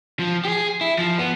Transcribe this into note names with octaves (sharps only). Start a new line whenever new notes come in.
F3
G4 G#4
E4
F3
B3